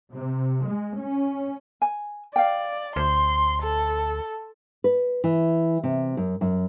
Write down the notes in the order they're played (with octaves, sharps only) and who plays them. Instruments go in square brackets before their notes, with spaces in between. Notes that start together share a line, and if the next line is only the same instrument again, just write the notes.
[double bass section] C3
G#3
C#4
[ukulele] G#5
[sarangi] D5 [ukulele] F5 G5
[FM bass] D2 [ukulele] C5 [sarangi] C6
[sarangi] A4
[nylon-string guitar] B4
E3
C3
F#2
F#2